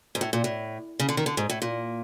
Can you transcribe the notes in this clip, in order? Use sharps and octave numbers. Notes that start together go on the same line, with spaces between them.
G#2
A2
A#2
A2
C#3
D3
D#3
D3
G#2
A2
A#2